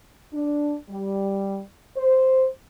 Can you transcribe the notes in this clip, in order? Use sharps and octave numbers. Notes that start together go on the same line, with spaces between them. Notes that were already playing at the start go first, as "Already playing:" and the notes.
D4
G3
C5